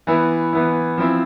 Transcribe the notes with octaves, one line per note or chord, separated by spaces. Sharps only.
E3 B3 E4
E3 B3 E4
F3 C4 E4